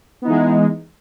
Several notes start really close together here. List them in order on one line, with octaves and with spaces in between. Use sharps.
B3 D#4 E3 G#3